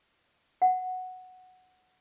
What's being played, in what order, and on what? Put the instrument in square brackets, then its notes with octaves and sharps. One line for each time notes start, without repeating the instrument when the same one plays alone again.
[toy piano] F#5